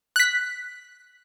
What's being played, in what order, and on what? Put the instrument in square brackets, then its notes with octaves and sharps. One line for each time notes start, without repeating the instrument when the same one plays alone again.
[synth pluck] F#6 B6